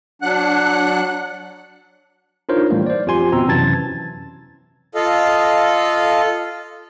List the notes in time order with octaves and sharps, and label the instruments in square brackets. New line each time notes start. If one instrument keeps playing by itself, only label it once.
[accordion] F#3 D4 F#5 F#6
[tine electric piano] D4 D#4 F4 A#4 C5 C#5
A2 E3 G3 A3 A#3
C5 D5
F2 F4 G4 G#5 C6
G#1 B2 C4 A#5 C6 E6
F#2 C3 E3 A5 G#6 A6
[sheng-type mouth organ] F4 A4 D#5 F5